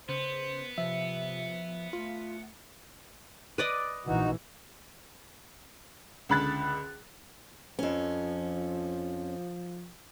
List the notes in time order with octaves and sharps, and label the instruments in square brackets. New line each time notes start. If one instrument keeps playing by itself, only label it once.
[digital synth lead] C#3 [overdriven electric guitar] B3 [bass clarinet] C5
[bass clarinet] C3 [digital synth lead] F3 [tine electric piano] E5
[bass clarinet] A3 [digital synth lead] F4
[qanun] B4 D5 D#5
[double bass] A#1 E3 [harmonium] D#4 F#4
[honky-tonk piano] C#2 D3 B5 F#6 A6
[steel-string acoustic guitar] F2 C#4 [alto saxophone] F3